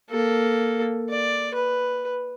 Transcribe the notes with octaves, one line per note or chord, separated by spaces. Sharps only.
A#3 A4
D5
B4